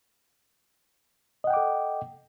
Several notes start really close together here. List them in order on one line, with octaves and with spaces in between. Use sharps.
D#5 F#5 G5 D6 A4